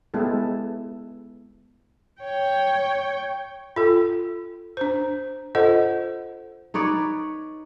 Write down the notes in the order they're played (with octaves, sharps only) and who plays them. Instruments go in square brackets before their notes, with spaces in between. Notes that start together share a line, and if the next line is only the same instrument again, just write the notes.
[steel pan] G#3 B3 E4 G4 A4
[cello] C#5 G5
[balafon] F4 A4
D4 C5
F4 A4 C5 D#5 F#5
[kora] D#4 B4 C#5 D5